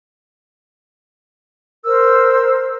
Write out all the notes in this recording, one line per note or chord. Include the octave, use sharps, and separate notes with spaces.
A#4 C5 E6